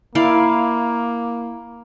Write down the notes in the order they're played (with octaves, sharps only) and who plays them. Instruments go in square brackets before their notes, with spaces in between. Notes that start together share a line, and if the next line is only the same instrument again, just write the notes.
[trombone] A#3 [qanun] E4 D5 F5